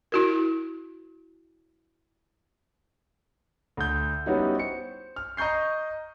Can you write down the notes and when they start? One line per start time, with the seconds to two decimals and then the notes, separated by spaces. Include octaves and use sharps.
0.12 E4 F#4 A#4
3.77 D2 G6
4.26 G3 B3 C#4 D#4 E4 F#4
4.58 C5 C#7
5.16 F6
5.37 D#5 A#5 C#6 G6 C7